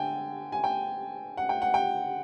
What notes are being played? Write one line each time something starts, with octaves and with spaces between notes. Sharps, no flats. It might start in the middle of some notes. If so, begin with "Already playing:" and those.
Already playing: D3 G5 G#5
G#5
G5
F#5
G5
F#5
G5